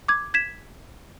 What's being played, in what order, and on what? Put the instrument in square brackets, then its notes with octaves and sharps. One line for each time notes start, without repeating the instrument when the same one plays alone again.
[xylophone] D6 G#6
G#6 B6 E7